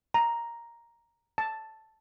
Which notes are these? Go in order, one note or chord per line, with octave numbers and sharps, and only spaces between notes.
A#5
A5